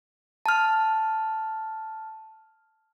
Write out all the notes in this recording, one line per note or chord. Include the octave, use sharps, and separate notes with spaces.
A5 F6